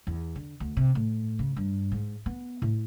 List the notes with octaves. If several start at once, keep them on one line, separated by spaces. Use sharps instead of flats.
E2
D3
D2
C3
A2
C#3
G2
G#2
B3
A2